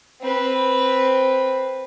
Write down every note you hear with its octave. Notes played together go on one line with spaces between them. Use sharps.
C4 B4